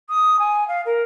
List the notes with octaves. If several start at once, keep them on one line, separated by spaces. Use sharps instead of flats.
D#6
G#5
F5
A#4